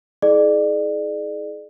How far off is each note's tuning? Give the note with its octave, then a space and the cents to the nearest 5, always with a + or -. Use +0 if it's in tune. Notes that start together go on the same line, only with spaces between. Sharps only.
E4 -40 G#4 +35 D5 +30